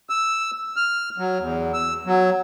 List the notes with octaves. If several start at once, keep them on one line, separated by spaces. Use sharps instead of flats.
E6
F6
F#3
E2
E6
F#3